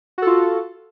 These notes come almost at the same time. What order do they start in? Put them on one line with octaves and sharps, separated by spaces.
F#4 A4 F4